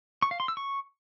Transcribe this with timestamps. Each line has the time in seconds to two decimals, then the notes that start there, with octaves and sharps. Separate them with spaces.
0.22 C#6
0.31 F5
0.40 C6
0.48 E6
0.57 C#6